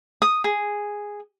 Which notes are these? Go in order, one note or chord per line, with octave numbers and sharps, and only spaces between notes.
D#6
G#4